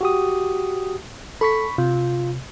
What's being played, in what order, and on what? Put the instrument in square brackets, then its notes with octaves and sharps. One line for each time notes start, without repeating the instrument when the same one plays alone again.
[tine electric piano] F#4 G4 D#6
[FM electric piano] A4 [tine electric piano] B5 C#6 B6
[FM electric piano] C3 [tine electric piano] F4